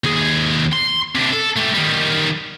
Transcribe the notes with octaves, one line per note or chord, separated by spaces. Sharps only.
D#2 G#4
C6
C3 D4
A4
A3 G4
D#3 G3